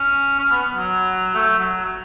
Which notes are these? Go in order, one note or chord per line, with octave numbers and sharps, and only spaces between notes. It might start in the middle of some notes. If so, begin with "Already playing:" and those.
Already playing: C#4
C#4
B3
F#3
A3
F#3